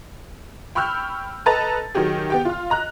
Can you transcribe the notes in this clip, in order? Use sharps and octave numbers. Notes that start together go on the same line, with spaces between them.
G5 B5 C#6 E6 F6 G6
A4 B4 D#5 A5 A#5 A6
D#3 F#3 G4 G#4
B3 G4 G5
F4 F6
D#5 A#5 F#6